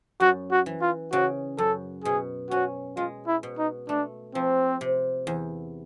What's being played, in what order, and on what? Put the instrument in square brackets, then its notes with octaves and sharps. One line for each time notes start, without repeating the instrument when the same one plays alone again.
[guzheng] F#2 [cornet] F#4
[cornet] F#4
[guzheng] E3
[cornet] F4
[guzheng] C#3 [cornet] F#4
[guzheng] F#2 [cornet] A4
[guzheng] B2 [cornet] G#4
[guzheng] C#4 [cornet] F#4
[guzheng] G#3 [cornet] F4
[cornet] E4
[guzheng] B2
[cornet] D#4
[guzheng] A3 [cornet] D4
[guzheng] F3 [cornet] C4
[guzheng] C3
E2